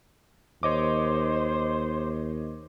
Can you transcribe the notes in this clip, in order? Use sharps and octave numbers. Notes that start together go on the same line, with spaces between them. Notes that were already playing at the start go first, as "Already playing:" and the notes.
D#2 C5 C#5 D#5 D6